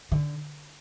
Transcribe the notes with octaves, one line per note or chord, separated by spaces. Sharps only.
D3